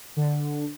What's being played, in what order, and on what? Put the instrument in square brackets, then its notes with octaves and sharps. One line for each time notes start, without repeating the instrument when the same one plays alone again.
[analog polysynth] D3